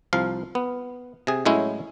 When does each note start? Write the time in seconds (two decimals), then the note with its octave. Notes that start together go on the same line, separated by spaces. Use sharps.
0.13 C2 F3 F5
0.55 B3
1.27 C3 G#4
1.46 A2 F#3 G#3 C#4 E4